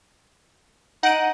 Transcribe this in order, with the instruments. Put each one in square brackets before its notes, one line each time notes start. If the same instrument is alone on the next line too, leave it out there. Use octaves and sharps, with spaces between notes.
[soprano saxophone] D#4 [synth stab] F#5 D7 D#7